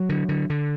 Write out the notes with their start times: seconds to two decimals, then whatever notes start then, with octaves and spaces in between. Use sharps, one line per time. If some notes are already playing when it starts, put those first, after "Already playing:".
Already playing: F#3
0.09 D3
0.29 D3
0.50 D3